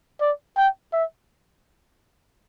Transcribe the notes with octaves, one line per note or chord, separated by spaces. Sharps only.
D5
G5
E5